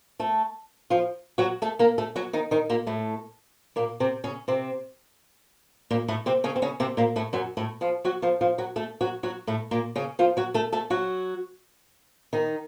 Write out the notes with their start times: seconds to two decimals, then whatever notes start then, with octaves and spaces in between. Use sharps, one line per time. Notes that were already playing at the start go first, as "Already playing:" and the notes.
0.20 A3 A4
0.90 F3 F4
1.38 F#3 F#4
1.62 A3 A4
1.79 A#3 A#4
1.98 A3 A4
2.16 F#3 F#4
2.33 D#3 D#4
2.51 D#3 D#4
2.69 A#2 A#3
2.87 A2 A3
3.76 A#2 A#3
4.00 C3 C4
4.24 C#3 C#4
4.48 C3 C4
5.91 A#2 A#3
6.08 A2 A3
6.26 C3 C4
6.44 C#3 C#4
6.56 C4
6.62 C#3 C#4
6.80 C3 C4
6.97 A#2 A#3
7.16 A2 A3
7.33 F#2 F#3
7.57 A2 A3
7.81 F3 F4
8.05 F#3 F#4
8.22 F3 F4
8.41 F3 F4
8.58 F#3 F#4
8.76 A3 A4
9.01 F#3 F#4
9.23 F#3 F#4
9.47 A2 A3
9.71 A#2 A#3
9.96 C#3 C#4
10.19 F3 F4
10.37 F#3 F#4
10.54 A3 A4
10.72 A3 A4
10.90 F#3 F#4
12.33 D#3 D#4